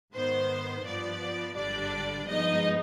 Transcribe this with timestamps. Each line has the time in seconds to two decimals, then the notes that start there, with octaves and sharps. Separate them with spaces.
0.14 G#2 D#3 B3 C5
0.85 G2 F3 B3 D5
1.56 G#1 G2 D3 G3 D4 D5
2.27 G2 F3 G#3 B3 D#4 D#5